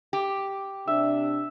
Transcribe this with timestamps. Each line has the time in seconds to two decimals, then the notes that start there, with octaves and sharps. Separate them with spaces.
0.13 G4
0.87 C3 D4 E5